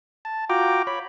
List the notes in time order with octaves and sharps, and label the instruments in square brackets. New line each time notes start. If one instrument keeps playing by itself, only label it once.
[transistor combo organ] A5
F4 F#4 G5 A#5 D6
C#5 B5